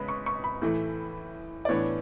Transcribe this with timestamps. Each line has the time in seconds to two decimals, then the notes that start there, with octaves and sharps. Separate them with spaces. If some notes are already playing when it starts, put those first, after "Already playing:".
Already playing: C#3 G#3 B3 B5
0.08 C#6
0.26 C#6
0.44 B5
0.62 A2 E3 A3
1.65 D5
1.69 A2 E3 B3 D4 C#5